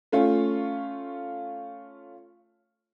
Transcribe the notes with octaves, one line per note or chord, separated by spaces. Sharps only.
A3 C#4 F4